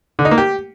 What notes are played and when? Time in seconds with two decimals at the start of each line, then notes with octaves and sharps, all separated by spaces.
0.19 D3
0.25 D#4
0.31 A#3
0.38 G4